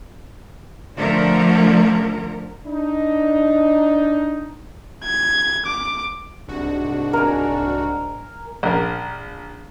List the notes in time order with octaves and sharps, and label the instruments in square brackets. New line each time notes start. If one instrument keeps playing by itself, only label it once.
[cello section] D3 F3 A3 A#4
[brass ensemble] D4 D#4
[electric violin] G#6
D6
[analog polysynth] C2 F#4 [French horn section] G#2 D4
[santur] A#4 G#5
[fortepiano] A#1 A#4